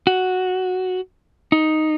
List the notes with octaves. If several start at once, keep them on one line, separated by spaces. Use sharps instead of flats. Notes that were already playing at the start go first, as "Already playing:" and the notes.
F#4
D#4